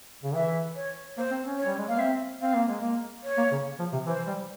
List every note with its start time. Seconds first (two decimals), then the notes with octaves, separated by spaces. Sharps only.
0.24 C#3
0.34 E3 E5
0.76 C#5
1.17 A#3 C5
1.31 C4
1.44 C#4
1.58 C#5
1.65 G3
1.78 G#3
1.88 A#3 F5
2.00 C4 E5
2.41 C4 F5
2.54 A#3
2.68 G#3
2.81 A#3
3.24 C#5
3.37 A#3
3.52 C#3
3.79 F3
3.92 C3
4.06 E3 C5
4.27 G3